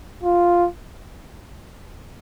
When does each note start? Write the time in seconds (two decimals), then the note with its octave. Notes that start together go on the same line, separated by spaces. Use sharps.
0.23 F4